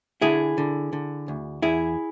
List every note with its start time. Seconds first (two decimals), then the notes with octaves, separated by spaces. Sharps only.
0.22 D3 E4 G#4
0.58 D3
0.93 D3
1.28 D2
1.62 E2 E4 G#4